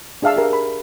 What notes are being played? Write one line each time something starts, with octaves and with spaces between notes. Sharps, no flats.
D4 G#4 E5 F5 A5 E6
G4 A#4
B5